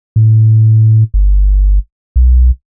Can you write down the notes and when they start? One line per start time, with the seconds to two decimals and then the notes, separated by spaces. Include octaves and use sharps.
0.16 A2
1.14 G1
2.16 B1